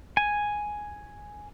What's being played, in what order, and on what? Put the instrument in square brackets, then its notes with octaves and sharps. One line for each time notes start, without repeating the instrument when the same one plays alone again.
[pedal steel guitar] G#5